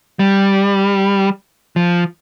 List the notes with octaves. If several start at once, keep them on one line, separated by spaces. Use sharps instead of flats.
G3
F3